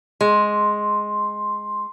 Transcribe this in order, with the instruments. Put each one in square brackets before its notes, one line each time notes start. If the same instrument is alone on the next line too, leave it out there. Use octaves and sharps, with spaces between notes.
[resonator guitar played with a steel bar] G#3 [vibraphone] C6